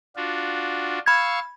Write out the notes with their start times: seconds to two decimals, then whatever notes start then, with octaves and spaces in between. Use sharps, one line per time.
0.16 D4 F4 F#4
1.06 F5 B5 C#6 E6 G#6